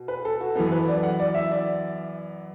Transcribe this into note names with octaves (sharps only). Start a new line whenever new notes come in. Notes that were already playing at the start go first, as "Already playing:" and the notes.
Already playing: B2
B4
A4
F#4
F#2 E3 B3 A4
B4
D5
F#5
D5
E5
D5